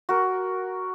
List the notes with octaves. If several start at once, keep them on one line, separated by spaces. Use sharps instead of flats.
F#4 A#4